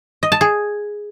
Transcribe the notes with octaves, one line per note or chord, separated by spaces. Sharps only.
D#5
A5
G#4